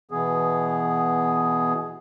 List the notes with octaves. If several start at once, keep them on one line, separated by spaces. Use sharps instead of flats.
B2 E3 B3 G#4